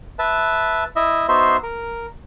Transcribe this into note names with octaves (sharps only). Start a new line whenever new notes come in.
B4 E5 A5
E4 D#5 E5
B3 D#4 F#4 C5 E5 C6
A#4